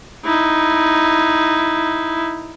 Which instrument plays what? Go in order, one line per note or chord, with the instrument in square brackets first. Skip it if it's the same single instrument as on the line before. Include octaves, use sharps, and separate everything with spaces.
[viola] D#4 E4